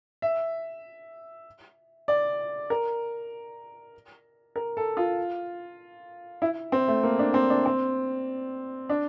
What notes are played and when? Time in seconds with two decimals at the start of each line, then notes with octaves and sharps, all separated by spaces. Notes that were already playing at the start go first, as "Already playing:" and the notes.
0.22 E5
2.08 D5
2.70 A#4
4.56 A#4
4.77 A4
4.97 F4
6.42 E4
6.72 C4
6.88 A3
7.03 A#3
7.19 D4
7.34 C4
7.50 D4
7.66 C4
8.89 D4